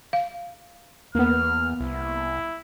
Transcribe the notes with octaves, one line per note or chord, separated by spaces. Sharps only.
F5
E2 A#3 B3 F6
C2 E4